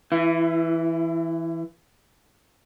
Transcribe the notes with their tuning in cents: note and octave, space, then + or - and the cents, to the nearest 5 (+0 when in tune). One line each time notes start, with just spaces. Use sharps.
E3 +0 E4 +35